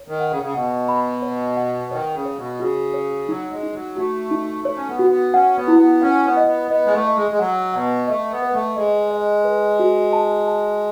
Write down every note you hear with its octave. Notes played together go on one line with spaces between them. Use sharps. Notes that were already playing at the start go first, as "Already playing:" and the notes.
Already playing: C#5
D#3
F#5
C#3
C#3
B2 F#5
B5
C#5
F#5
D#3 C#5
C#3
C#5
B2
C#3 F#4
C#5
F#3 D#4
G#3
D#4
F#3
A3 F#4
D#4
A3 C#5
C#4
B3
F#4
B3
C#4 F#5
B3
E4
B3
C#4 F#5
B3
D#5
B3
B3 D#5
G#3
A3
D#5
G#3
G#3
F#3 F#5
B2 F#5
A3 D#5
B3
B4
A3
G#3 D#5
D#5
B4
F#4
A5
A5